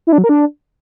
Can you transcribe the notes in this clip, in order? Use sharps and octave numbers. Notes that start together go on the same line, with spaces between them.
E4
D4
F#3
A#4
D4